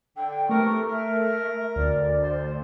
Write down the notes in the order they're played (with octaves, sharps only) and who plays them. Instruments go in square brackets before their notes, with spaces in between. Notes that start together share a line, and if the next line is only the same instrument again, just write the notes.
[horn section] D3 [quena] G5
[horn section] C3 E3 A#4 [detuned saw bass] A3 [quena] C#6
[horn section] A#4 [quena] E5
[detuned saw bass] D2 [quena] D5
[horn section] C5